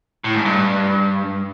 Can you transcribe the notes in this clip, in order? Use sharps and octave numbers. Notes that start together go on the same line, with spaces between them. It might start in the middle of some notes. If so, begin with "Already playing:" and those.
A2
G#2
G2